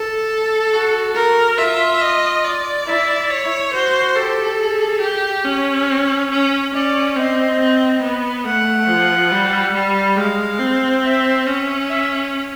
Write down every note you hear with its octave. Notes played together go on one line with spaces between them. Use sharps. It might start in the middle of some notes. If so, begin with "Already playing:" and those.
Already playing: A4
F#4
A#4
F4 E5
D#5
D5
E4
C#5
F#4 C5
G4 A4
G#4
G4
C#4 C#5
C#4
C#4 D5
C4 D#5
C4
B3
A3 F#5
F3
G3
G3
G#3 F5
C4
E5
C#4
E5